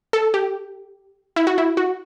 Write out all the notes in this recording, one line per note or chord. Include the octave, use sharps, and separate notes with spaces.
A4
G4
E4
F#4
E4
F#4